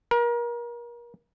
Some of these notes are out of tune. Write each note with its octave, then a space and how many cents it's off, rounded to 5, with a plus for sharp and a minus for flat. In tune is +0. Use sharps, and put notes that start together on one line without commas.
A#4 +30